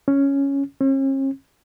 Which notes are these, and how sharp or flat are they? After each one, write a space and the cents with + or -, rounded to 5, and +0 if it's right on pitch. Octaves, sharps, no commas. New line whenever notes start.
C#4 +0
C#4 -45